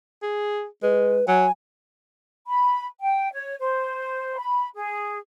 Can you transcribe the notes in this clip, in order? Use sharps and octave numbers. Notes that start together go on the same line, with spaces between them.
G#4
G#3 B4
F#3 G#5
B5
G5
C#5
C5
B5
G#4